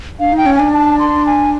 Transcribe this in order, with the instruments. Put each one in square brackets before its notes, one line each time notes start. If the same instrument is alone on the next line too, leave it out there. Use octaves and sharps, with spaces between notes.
[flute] D4 [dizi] F5
[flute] D#4 [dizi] G5
[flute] C#4
[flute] D4 [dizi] G#5
[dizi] A5
C6
G#5